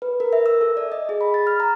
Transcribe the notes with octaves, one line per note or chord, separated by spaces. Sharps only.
B4
A#4
E5
E6
A4
D5
D#5
G#4
B5
A6
F6
A#5